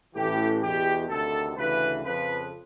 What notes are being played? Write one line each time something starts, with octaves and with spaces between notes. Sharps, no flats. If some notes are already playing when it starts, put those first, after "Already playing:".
A1 A2 E3 G4
E2 B2 G4
D2 C3 D#3 A4
D2 C#3 E3 B4
F2 C#3 F3 B4